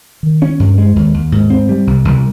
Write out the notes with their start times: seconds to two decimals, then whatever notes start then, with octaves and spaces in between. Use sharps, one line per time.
0.23 D#3
0.42 C#4
0.60 G2
0.78 G#3
0.96 D#2
1.14 D#2
1.32 G#2
1.50 C4
1.69 G3
1.87 C2
2.05 C2